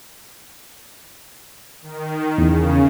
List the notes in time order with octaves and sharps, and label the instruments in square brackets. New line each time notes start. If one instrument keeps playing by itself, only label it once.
[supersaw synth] D#3
[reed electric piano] E2 [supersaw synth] C#3